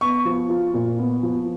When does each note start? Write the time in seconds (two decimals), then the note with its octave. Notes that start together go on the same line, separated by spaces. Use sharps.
0.01 B3 C#6
0.25 F3
0.50 F4
0.74 A#2
0.99 B3
1.23 F3